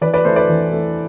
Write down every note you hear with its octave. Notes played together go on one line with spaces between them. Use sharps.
E3 B4 D5
B4 D5
A3 E4 A4 C5
B4 D5
E3
A3 E4